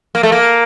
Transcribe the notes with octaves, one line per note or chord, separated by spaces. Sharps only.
A#3
A3
A#3